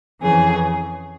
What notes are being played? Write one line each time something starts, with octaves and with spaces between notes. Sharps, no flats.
F2 C#3 E3 G#4